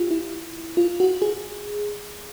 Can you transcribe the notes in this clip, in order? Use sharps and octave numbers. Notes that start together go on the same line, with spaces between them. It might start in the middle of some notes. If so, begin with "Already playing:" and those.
Already playing: F4 G4
E4
F4
F#4
G#4